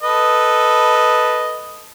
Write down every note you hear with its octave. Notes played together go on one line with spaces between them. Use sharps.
A4 B4 D#5